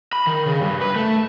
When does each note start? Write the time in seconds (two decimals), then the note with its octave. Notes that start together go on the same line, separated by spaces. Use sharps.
0.13 B5
0.27 D#3
0.47 C#3
0.61 G2
0.81 B4
0.96 A3